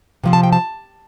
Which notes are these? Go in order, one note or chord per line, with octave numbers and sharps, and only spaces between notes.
C3 F3 C4
A5
G5
A5